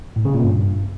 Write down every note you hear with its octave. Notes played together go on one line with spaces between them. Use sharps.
A2
C#3
A#2
G2